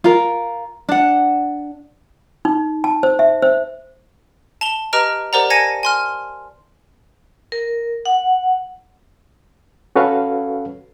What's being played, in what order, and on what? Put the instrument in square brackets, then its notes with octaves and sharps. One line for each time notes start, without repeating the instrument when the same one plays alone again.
[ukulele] F4 A#4
D4 F#5
[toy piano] D#4
A5
C5
E5
C5
[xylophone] A5 F7 G7
G4 B4 D#5 A#5 F6 D7
G4 A#4 C5 D5 F#5 A#5
G#5 A5 G#6 A#6 C#7 D#7
G#5 C6 F6
[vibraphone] A#4
F#5
[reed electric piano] C#4 F#4 A4 B4 C#5 F5